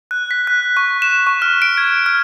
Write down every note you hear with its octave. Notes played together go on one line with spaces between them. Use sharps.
F#6
B6
F#6
C#6
E7
C#6
F6
D7
G#6
F6